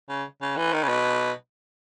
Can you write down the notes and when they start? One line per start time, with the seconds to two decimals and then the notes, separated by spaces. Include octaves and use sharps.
0.09 C#3
0.41 C#3
0.57 E3
0.72 D#3
0.83 C#3
0.88 B2